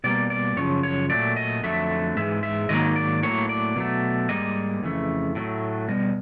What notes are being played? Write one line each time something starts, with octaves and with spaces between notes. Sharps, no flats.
B2 G3 A#3 D5
D5
F#2 C#3 F3 C#5
C#5
A#2 F#3 A3 D5
D#5
F2 D3 F#3 A3 E5
G#2 E3 G#3 E5
E5
G#2 D#3 F#3 A#3 D#5
D5
A2 F#3 A#3 C#5
D5
B2 F#3 A3
G#2 E3 G3 A#3 D#5
F2 C#3 E3 A3
A2 F#3 A3
B2 G3 D#5